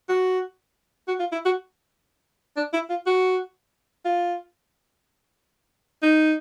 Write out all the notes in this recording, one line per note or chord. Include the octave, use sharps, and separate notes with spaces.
F#4
F#4
F4
E4
F#4
D4
E4
F4
F#4
F4
D#4